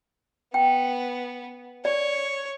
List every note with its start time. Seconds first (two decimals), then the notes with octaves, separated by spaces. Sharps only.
0.54 B3 G5
1.85 C#5 D5